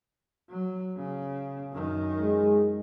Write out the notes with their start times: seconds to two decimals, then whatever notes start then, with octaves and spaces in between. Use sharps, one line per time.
0.49 F#3
0.97 C#3
1.72 F#2 D#3
2.19 G#3